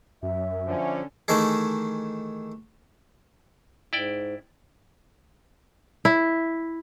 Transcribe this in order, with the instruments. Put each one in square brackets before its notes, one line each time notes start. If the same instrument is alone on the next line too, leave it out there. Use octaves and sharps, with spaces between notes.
[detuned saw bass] F#2 [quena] E5
[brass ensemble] D3 C#4 [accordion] F3
[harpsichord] D#3 E3 A3 D#4 G#4
[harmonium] G#2 [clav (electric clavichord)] E4 D5 G5
[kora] E4